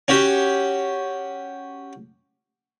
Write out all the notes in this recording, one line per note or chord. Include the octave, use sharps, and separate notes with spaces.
C#4 F#4 G4